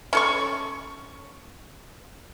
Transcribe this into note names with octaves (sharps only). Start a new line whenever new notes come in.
C#4 A4 C#6